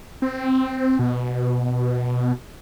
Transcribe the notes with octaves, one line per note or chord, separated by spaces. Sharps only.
C4
B2